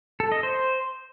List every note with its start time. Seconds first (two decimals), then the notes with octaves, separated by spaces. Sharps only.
0.20 A4
0.32 D#5
0.43 C5